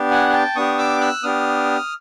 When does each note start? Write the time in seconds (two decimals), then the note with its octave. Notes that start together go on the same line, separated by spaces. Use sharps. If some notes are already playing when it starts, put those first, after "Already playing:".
Already playing: B3 D4 G4
0.11 F#5 G#5
0.30 G#5
0.33 G5 A5
0.56 B3 D4 G4 C#6 D#6
0.78 D6 E6
1.01 E6 F#6
1.23 B3 D4 G4 D#6 F6